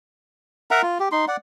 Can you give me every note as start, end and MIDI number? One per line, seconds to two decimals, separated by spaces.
0.71 0.82 70
0.71 0.82 76
0.71 0.82 78
0.71 0.82 82
0.82 0.98 65
1.00 1.09 67
1.12 1.25 63
1.12 1.25 84
1.28 1.37 74
1.28 1.37 78